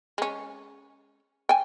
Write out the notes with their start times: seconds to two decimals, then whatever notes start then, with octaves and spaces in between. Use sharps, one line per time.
0.18 G#3 C#4
1.49 G5 G#5